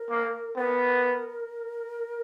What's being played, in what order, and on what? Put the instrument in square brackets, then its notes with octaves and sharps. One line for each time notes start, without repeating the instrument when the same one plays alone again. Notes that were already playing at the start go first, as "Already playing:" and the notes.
Already playing: [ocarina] A#4
[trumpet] A#3
[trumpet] B3 [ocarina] A#4